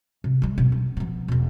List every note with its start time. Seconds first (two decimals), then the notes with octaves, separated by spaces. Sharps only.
0.24 C3
0.42 G3 G#3
0.58 B2
0.72 D4
0.97 F3 B3
1.28 E1 B2